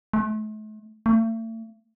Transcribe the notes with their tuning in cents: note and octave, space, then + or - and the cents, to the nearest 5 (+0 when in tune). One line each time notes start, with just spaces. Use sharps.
A3 -40
A3 +40